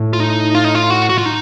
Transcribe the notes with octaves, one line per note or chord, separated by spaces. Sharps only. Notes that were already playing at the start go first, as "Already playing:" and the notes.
Already playing: A2
F4
D#4
F4
D#4
F4
F#4
F#4
F4
D#4